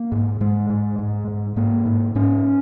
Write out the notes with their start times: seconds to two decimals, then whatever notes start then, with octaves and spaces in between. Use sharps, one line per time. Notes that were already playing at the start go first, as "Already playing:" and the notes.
Already playing: A#3
0.12 G#2
0.41 G#2 G#3
0.70 G#2
0.99 G#2
1.28 G#2
1.56 G#2 A#3
1.86 G#2
2.15 G#2 C#4